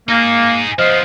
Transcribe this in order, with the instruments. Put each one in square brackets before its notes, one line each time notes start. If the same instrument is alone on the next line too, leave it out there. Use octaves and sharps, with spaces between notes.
[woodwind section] A#3 [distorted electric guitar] D#4 G#4
[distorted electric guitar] F3 B3 [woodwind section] C5 D#5 F5